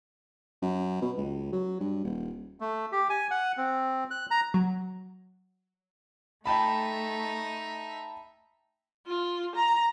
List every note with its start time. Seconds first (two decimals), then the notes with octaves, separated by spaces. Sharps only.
0.62 F#2
1.02 B2
1.17 C#2
1.52 F#3
1.80 G2
2.04 D#1
2.60 A3
2.92 G4
3.10 G#5
3.31 F#5
3.57 C4
4.11 F#6
4.31 A#5
4.54 F#3
6.46 A3 D#4 E5 G5 A5 B5
9.07 F4
9.56 A#5